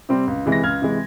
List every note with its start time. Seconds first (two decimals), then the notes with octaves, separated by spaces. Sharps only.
0.09 C3 G3 C4
0.27 C#2
0.46 C3 E3 G#3
0.52 A#6
0.63 C#2 F6 G#6
0.82 C3 E3 G#3